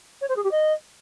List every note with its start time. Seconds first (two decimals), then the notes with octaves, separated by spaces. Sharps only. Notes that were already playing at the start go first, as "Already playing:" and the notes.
0.21 C#5
0.29 C5
0.36 G#4
0.44 G4
0.51 D#5